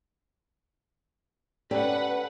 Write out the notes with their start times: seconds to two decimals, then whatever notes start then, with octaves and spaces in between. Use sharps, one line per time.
1.71 C#4 G4 A4 B4 D5 F#5